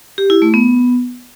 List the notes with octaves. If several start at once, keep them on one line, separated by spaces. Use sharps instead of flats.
G4
E4
A3
B3